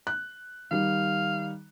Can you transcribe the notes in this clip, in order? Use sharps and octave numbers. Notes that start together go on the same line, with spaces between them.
F#6
D#3 G3 F5